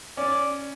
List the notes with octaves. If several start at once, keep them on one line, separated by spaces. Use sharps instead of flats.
C#4 D5